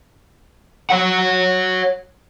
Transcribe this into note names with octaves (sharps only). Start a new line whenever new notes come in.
C#5 F#5